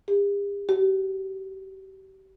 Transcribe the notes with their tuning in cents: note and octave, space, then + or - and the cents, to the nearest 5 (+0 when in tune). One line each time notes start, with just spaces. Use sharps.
G4 +45
G4 -40